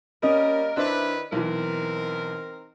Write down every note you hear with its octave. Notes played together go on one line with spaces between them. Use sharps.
G3 A#3 C#4 A#4 D#5
D#3 D4 E4 B4 C5 E5
B1 E3 C4 D#4 A#4